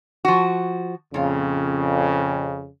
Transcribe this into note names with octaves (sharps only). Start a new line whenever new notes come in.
F3 F#4
F2 A#2 C#3 F4